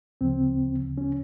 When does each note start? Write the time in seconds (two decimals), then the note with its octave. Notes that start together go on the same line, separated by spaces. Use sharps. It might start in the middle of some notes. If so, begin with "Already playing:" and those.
0.21 D2 C#3 F3 C4
0.98 C#4